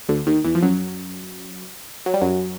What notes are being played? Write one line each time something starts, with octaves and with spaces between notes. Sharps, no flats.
D2 D3
D#2 D#3
E2 E3
F3
F#2 F#3
F#3
G3
F#2 F#3